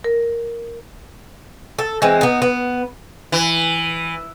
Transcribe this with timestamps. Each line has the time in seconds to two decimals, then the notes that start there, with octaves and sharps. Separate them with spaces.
0.04 A#4
1.79 A4
2.02 E3 G#3 C4
2.21 B3 D#4
2.42 B3
3.32 E3